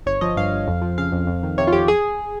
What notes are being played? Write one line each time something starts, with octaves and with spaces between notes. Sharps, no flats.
G1 C#5
F3 D#5
G2 F5
G1
F2
F3
C#3 F5
F2
F2
D#3
C3 C#5
F4
F2 G4
G#4